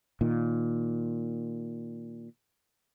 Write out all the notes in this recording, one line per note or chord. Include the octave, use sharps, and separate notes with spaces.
A#2 D#3